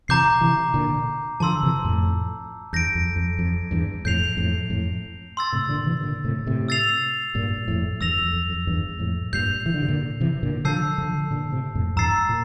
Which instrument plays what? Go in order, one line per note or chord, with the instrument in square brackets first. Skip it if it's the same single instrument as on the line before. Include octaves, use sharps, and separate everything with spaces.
[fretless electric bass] C3 E3 [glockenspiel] A#5 D6 G6 C7
[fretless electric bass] C3 E3
A#2 D3
[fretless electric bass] D3 F3 [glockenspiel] A5 C6 E6
[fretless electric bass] C3 E3
F2 A2
[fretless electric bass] E2 G2 [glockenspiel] G6 A#6 D7
[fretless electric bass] F2
F2
F2
E2 G2
[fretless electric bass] F2 A2 [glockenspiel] G6 C7 F7
[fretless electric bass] F2 A2
F2 A2
[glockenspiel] C6 E6 A6
[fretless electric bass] A2 C3
A#2 D3
C3 E3
A#2 D3
A2 C3
A2 C3
[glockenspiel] E6 A6 C7 F7
[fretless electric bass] G2 A#2
F2 A2
[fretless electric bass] E2 G2 [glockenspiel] E6 A#6 F7
[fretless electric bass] F2
F2
F2
E2 G2
F2 A2
[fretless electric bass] G2 A#2 [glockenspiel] G6 C7 F7
[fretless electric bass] E3
D3
C3
A#2 D3
C3 E3
A#2 D3
[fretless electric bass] D3 F3 [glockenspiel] A5 E6 G6 C7
[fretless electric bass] D3 F3
A#2 D3
A2 C3
F2 A2
[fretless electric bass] E2 G2 [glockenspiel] A#5 E6 A6 C7
[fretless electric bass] A#2